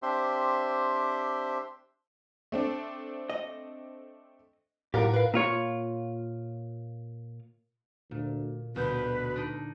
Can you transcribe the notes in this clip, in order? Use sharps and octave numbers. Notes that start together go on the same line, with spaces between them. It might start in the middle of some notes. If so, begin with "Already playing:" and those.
C4 D4 G4 C5 E5 C6
A3 C4 D4
D#5
B1 A2 F4 G4 A#4 F#5
B4 F5
A#2 F4 C#5
D2 A#2
D2 B2 B4 G6
D4 D#4